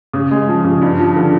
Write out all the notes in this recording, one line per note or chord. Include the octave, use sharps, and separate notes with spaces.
C#3
G#3
F3
C#3
G2
F3
D3